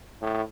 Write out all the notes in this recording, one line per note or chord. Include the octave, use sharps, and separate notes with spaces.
A2